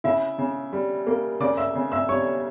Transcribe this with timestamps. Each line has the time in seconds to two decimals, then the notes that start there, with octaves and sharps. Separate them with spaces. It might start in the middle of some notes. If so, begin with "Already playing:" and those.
0.04 C#3 E4 E5
0.38 C#3
0.73 G3
1.07 A#3
1.40 C#3 D5 D6
1.57 E5 E6
1.75 C#3
1.92 E5 E6
2.09 G3 C#5 C#6